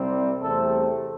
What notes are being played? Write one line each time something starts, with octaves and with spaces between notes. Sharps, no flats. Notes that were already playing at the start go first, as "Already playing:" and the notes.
Already playing: C2 C3 G3 C4
E2 C3 A3 C4 A4